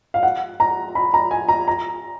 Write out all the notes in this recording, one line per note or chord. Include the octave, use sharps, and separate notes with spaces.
F5
F#5
A#5
B5
A#5
G#5
A#5
A#5